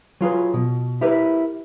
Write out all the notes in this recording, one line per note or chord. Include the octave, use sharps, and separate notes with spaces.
F#3 F4 G#4 B4
B2
E4 G4 A#4 B4